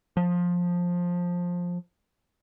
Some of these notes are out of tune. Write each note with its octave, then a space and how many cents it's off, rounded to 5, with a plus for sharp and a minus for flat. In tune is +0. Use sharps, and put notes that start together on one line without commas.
F3 +15